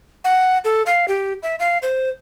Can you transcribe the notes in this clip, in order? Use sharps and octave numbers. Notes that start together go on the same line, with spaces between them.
F#5
A4
F5
G4
E5
F5
C5